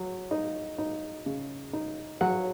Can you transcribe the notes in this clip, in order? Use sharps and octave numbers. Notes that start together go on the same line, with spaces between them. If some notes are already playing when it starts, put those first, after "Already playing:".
Already playing: F#3
D#4
D#4
C#3
D#4
F#3 F#5